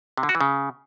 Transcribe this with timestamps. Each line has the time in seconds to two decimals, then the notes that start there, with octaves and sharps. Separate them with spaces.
0.17 C3
0.23 D3
0.29 F#4
0.35 E3
0.41 C#3